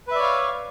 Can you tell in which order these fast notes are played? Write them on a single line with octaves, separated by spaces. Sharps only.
B4 E5 D5 C#5 F5